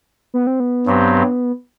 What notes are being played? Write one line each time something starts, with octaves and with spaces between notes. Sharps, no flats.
B3
C4
B3
G2 F#3 C4 G4